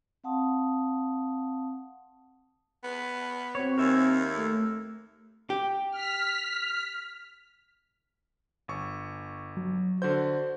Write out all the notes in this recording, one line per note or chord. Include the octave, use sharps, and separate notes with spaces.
C4 F5 F#5 A5 C6 D#6
B3
C4 F#4 C#5
D#2 A#4 E5 G#5
A3
G4
F6 B6
G1 C#6
F#3
D3 F#4 C5 G6